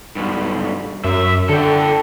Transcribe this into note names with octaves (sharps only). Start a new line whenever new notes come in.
B1 G2
F#2 E5
D3 A4 G5